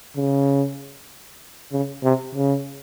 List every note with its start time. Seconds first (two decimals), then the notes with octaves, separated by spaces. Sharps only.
0.17 C#3
1.73 C#3
2.04 C3
2.35 C#3